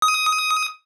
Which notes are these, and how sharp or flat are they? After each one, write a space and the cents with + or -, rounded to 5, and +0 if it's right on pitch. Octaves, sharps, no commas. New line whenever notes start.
D#6 +15